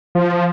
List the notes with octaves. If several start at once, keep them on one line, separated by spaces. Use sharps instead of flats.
F3